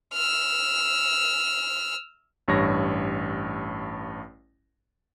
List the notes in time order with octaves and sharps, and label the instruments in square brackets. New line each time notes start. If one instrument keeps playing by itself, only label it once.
[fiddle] E6 F6
[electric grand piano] A1 G2 C#5 A#6